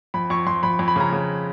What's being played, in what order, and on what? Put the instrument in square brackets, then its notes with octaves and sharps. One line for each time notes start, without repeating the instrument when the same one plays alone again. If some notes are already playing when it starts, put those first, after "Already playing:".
[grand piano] F2 B5
F2 C#6
F2 C6
F2 B5
F2
B5
C#3 A#5
C#3